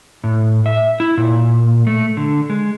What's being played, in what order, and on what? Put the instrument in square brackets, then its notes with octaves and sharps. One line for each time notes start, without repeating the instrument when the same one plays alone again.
[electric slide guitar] A2
E5
E4
A#2
A3
D3
G#3